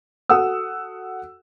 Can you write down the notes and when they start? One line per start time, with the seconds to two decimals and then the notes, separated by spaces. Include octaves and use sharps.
0.29 F#4 A4 F#5 D#6 E6